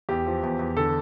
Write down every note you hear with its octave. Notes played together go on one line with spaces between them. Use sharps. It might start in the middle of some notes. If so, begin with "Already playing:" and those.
E2 G4
F3
E2
E2
D3 A4